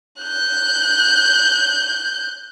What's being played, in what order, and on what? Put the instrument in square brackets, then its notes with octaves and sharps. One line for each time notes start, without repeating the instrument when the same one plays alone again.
[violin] F#6 G6